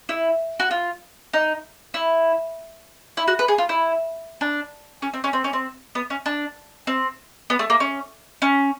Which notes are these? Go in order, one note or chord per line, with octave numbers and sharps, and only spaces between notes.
E4
F#4
F4
D#4
E4
E4
F#4
B4
G#4
F4
E4
D4
C#4
C4
C#4
C4
C#4
C4
B3
C#4
D4
C4
B3
A3
A#3
C#4
C#4